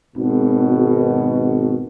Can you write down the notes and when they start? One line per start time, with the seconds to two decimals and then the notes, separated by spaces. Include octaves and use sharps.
0.16 G#1 B2